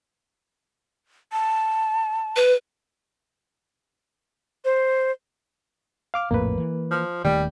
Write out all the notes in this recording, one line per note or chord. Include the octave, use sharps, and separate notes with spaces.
A5
B4
C5
F5 D6 F6
A#1 F2 A2 A#3 B4
E3
F3
D#1 D#3 G3 A3